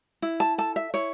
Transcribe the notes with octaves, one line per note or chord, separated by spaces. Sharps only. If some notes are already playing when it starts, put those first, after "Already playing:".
E4
A5
A4 A5
E5
E4 C#5